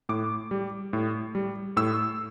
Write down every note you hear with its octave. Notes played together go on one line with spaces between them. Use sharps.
A2 D6
G3
A2
G3
A2 E6